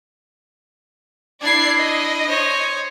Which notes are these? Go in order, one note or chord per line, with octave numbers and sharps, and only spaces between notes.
D4 E4 D5 G#6 C7
D#5
C5 C#5